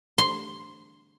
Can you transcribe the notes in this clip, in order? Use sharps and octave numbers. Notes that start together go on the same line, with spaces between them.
C6